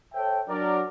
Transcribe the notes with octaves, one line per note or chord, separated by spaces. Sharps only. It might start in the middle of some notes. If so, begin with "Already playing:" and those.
A4 C5 C#5 E5 G5
F#3 D4 A#4 D5